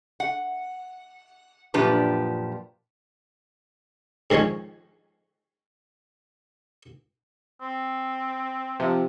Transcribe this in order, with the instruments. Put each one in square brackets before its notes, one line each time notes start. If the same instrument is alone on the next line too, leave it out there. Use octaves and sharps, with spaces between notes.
[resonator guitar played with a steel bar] F#5
F#2 A#2 F3 D4 G4 B4
[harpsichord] G#2 D#3 F3 C#4 C#5
[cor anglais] C4
[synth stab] C3 F3